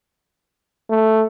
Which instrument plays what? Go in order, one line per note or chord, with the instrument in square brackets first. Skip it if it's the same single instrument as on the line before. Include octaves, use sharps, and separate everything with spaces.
[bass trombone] A3